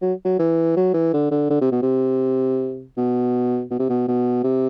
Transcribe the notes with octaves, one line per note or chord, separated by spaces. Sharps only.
F#3
F#3
E3
F#3
E3
D3
D3
D3
C3
B2
C3
B2
B2
C3
B2
B2
C3